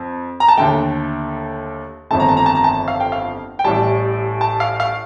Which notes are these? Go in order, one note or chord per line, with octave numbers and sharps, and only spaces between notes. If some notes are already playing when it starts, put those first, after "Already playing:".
Already playing: F2
A#5
A5
D#2 D3 A3 G5
G1 F2 D#3 A3 A5
A#5
A5
A#5
A5
A#5
A5
F5
G5
F5
G5
A1 A2 G3 A5
A5
F5
F5